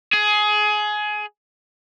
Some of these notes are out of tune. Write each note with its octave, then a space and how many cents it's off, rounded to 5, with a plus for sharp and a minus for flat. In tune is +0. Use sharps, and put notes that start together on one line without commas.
G#4 +20